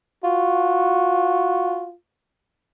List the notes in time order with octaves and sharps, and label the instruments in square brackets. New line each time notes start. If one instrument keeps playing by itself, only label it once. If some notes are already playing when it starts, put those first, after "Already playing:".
[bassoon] F4 [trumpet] F#4